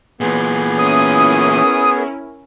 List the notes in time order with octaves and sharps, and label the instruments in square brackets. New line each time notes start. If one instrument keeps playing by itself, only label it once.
[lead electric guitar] A#2 E3 [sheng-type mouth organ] B3 G#4
[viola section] C#4 E4 A#4 [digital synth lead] D#6